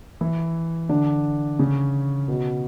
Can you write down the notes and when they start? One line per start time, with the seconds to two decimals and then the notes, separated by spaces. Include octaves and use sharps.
0.21 E3 E4
0.89 D3 D4
1.59 C#3 C#4
2.28 B2 B3